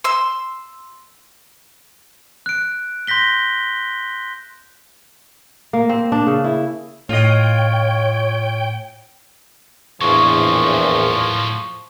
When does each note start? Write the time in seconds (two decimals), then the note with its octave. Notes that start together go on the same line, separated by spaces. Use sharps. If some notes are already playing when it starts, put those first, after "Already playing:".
0.04 C6 E6
2.46 F#6 D7
3.07 C6 G6 A#6 B6 G7
5.73 A#3
5.89 C4
6.12 D4
6.27 C#3
6.44 E4
7.09 A2 F4 C#5 D#5 G5
10.01 A#1 E2 A2 F3 F#3 C#6